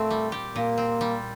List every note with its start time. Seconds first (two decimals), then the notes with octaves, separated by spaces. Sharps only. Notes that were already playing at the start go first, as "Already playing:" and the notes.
Already playing: A#2 A3 C4
0.11 G3
0.32 G4
0.55 A#2 A#3
0.78 C4
1.01 G3